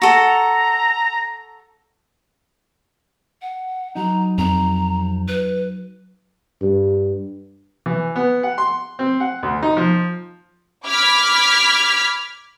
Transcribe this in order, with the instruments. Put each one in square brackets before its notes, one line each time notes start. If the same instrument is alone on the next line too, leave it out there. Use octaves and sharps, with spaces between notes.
[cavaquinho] F#4 A4 [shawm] A#5
[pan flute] F#5
[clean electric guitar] F#3 D#4 [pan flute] A#5
[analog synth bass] F2 [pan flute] A#5
[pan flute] B4
[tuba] G2
[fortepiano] E3
B3
F#5
C6
C4
F#5
D2
D#4
F3
[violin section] B5 D6 F6 G#6 B6